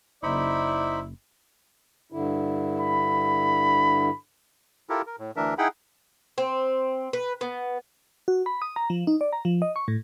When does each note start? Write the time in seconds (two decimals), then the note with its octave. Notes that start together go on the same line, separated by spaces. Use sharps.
0.23 F#1 D#4 E4 C5 D5 B5
2.12 G2 D3 E4
2.80 B5
4.89 E4 F4 G4 A4 A#4
5.07 A#4
5.18 A2
5.36 D2 E3 D4 A#4 E5
5.58 D#4 E4 G#4 F#5 G5 B5
6.38 C4
7.13 B4
7.41 B3
8.28 F#4
8.46 B5
8.62 D#6
8.76 A#5
8.90 F3
9.07 D#4
9.21 D5
9.33 A#5
9.45 F3
9.62 D#5
9.76 C#6
9.88 A2